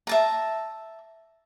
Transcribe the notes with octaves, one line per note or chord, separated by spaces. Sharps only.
E5 A5 A#5